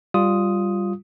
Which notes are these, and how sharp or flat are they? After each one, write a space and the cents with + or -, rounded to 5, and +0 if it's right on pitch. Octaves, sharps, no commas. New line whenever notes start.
G3 +0 F4 +0 D#6 +5